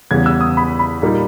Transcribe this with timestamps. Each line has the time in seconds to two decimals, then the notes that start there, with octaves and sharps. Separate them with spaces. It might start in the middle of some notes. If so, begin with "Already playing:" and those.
0.11 E2 C#3 G3 B3 G#6
0.26 E6
0.41 D#6
0.57 B5
0.79 B5
1.02 A#2 G3 A#3 D#4